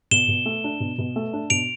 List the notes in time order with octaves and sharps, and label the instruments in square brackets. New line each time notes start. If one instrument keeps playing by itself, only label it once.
[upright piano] B2 [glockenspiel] E7 G7
[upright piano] B2
A3
D4
B2
B2
A3
D4
[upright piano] B2 [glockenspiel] D7 F7